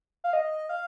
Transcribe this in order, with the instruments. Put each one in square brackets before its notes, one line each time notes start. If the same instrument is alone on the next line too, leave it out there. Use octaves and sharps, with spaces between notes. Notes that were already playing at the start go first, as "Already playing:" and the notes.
[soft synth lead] F5
D#5
F5